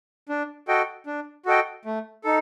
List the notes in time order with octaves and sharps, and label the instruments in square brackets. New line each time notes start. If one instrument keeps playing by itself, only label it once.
[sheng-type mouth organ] D4
F#4 A4 D#5 G5
D4
F#4 A4 D#5 G5
A3
D#4 A4